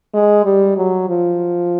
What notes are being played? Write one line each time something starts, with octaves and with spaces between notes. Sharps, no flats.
G#3
G3
F#3
F3